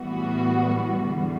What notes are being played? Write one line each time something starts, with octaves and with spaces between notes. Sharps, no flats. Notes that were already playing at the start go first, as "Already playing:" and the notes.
Already playing: A2 E3 G3 B3 F#4
E2 D3 G3